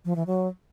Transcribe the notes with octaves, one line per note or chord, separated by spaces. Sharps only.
F3
E3
F#3